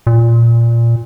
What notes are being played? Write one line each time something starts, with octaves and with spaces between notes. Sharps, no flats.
A#2